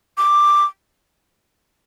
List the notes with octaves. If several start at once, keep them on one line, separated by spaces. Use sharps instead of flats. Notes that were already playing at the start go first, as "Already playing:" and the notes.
D6